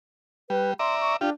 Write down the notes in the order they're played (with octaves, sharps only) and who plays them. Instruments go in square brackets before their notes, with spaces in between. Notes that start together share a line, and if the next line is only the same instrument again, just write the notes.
[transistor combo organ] G3 [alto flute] B4
[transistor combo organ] D5 E5 A#5 [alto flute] C6
[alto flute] C#6
[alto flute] D4 [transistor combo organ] F4 G4